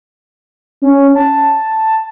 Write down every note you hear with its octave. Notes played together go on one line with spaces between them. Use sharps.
C#4
A5